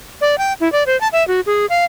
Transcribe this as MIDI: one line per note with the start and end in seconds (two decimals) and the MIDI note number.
0.21 0.38 74
0.38 0.53 79
0.60 0.71 64
0.72 0.83 74
0.86 0.99 72
1.01 1.08 81
1.13 1.26 76
1.28 1.40 66
1.46 1.66 68
1.70 1.85 77